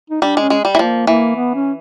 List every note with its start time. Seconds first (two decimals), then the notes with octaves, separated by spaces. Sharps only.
0.10 D#4
0.22 G3 D4
0.37 G#3 C#4
0.50 G#3
0.65 G3
0.75 E3
0.79 F3 A#3
1.07 E3 A#3
1.36 B3
1.55 C#4